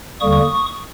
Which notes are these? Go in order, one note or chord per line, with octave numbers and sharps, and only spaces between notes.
D#2 D3 G3 A#3 C#6 D#6